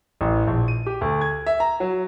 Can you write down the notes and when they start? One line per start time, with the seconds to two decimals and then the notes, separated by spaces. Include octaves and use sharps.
0.21 A1
0.47 A#1
0.68 D#7
0.86 G4
1.01 D2
1.21 G#6
1.46 E5
1.60 A#5
1.80 F#3